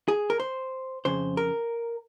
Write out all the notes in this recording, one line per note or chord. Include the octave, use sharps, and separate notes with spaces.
G#4
A#4
C5
F2 C#3 C5
A#4